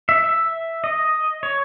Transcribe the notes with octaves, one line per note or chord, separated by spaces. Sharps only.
E5
E5
D#5
C#5